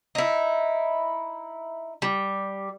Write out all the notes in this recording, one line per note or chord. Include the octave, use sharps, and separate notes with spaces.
D#4 E4
G3